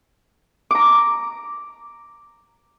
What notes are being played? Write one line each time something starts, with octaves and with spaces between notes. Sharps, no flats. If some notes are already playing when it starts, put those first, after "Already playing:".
A#5 D6